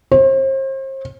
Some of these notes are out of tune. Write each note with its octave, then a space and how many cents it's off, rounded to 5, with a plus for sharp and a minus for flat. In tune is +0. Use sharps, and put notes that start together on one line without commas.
C5 +40